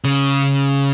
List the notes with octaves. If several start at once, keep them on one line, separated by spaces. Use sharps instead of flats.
C#3